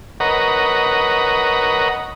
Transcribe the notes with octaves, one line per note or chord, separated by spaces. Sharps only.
A#4 B4 C#5 D#5 F#5 A#5